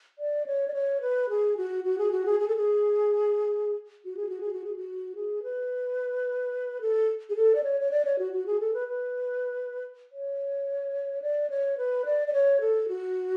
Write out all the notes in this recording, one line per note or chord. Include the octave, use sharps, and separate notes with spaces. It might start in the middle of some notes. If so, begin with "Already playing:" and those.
D5
C#5
D5
C#5
B4
G#4
F#4
F#4
G#4
F#4
G#4
G#4
A4
G#4
F#4
G#4
F#4
G#4
F#4
G#4
F#4
G#4
B4
A4
G#4
A4
D5
C#5
C#5
D5
C#5
F#4
F#4
G#4
A4
B4
B4
C#5
D5
C#5
B4
D5
D5
C#5
A4
F#4